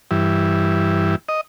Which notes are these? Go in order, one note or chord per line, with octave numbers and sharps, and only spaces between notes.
G2 E3
D#5